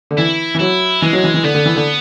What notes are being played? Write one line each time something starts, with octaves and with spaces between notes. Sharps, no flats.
D3
E3 E4
E3
F#3 E4
E3 G#3
F#3
E3
E3
D3 B3
D3
E3
D3